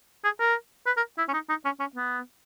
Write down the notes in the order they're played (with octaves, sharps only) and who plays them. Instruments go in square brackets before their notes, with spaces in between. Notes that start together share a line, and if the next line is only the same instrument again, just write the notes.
[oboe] G#4
A#4
B4
A#4
E4
C#4
D#4
D#4
C#4
C#4
B3